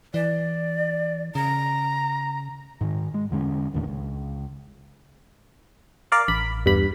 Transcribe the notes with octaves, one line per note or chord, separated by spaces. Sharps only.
E3 D5
C#3 A#5
G#2 D#3
G#3
E2 D3 G#3 C#4
F1 D#2 A2 D3
C#2
A#4 D5 F5
A1 B5
E2 G2 B5